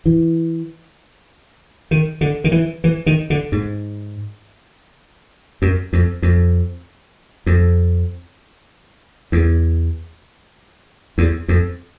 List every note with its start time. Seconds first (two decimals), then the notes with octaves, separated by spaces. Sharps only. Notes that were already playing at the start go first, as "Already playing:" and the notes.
0.06 E3
1.91 D#3
2.21 D3
2.44 D#3
2.52 E3
2.84 E3
3.06 D#3
3.30 D3
3.52 G#2
5.62 F#2
5.93 F2
6.22 F2
7.46 F2
9.32 E2
11.18 E2
11.48 F2